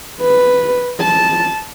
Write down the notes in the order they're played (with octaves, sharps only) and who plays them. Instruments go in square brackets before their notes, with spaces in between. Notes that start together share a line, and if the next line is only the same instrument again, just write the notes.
[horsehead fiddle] B4
A5